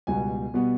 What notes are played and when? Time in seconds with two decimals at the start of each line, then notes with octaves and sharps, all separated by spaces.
0.07 C#2 B2 G3 B3 G#5
0.54 B2 G3 B3